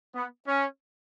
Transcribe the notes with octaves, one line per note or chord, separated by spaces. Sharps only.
B3
C#4